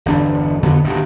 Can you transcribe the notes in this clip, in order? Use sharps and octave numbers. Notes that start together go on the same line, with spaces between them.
G1 E2 D4
F2 D3 B3
D#1 D2 G2